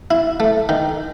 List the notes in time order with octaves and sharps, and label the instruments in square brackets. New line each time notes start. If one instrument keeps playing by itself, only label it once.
[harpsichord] E4
A3
D#3